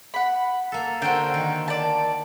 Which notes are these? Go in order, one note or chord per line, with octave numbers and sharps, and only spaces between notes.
F#5 B5
A#3 A4
D3 F#4 A#4 C5 G5
D#3
D5 A5